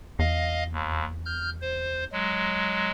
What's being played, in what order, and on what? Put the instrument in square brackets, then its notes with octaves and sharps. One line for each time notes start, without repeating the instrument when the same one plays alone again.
[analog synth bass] E2 [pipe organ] D#5 F5
[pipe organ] D#2
F6 G6
C5
F#3 G#3